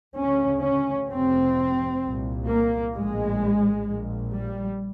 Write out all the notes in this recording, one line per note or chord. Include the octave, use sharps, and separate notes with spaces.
D2 C#3 C#4
C#4
F1 F2 C3 C4
C2 A#2
A#3
A#1 A2 G#3
A#1 A#2
G3